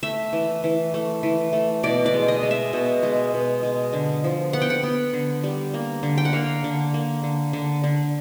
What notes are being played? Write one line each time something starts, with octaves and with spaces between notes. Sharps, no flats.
A3 E5
E3
E3
A3
E3
A3
B2 D5
D5
G#3
D#5
G#3
E5
B2
G#3
B2
G#3
D3
F3
B3 F#5
G5
F#5
B3
D3
G3
A#3
D3
G5
F#5
A#3 F5
D3
A#3
D3
D3
D3